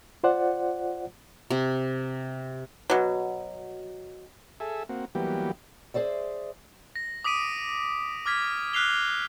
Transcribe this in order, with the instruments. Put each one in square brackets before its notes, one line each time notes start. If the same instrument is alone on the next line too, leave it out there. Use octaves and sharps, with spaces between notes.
[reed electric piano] F4 C5 D5 F#5
[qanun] C3
[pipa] B2 F#3
[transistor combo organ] G#4 A4 E5
A#3 C4 F#4
E3 F#3 G3 A#3 B3 G4
[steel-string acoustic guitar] G#4 C5 D5 E5
[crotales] A#6
D6 D#6 B6 D7 D#7
D6 F6 G#6 B6
F6 F#6 B6 C7 F7 G7